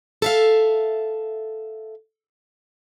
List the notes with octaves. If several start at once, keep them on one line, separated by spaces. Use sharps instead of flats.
A4 E5 F5